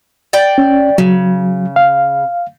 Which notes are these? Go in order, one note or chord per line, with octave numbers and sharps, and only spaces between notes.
D5 G5
C#4
C#3 F#3
F5